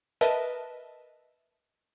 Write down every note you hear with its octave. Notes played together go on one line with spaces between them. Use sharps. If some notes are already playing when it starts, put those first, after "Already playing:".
A#4 B4 D#5 E5 A5